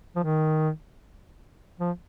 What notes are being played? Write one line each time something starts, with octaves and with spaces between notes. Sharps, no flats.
F3
D#3
F3